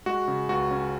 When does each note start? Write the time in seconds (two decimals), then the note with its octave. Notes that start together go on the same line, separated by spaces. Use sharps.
0.06 G#3 F#4
0.28 C#3
0.49 C#2 F#4
0.71 C#4